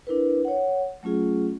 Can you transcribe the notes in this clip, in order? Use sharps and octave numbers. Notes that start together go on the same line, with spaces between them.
D4 E4 A#4 B4
C#5 F#5
F#3 A3 C#4 F4 G#4